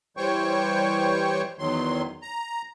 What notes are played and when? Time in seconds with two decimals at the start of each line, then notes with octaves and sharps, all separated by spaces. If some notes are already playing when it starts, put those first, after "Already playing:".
0.17 E3 G3 C5 C#5 G5 C#6
1.59 E2 D#3 F#3 C6
2.22 A#5